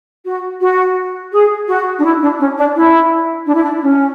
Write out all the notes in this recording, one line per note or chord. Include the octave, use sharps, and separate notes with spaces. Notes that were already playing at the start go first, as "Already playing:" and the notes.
F#4
F#4
G#4
F#4
D4
E4
D4
C#4
D4
E4
D4
E4
D4
C#4